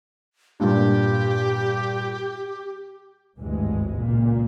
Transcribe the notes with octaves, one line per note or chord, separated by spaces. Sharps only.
G2 A#2 D4 G4
G#1 D2 G2 E3 G#3
C#2 A#2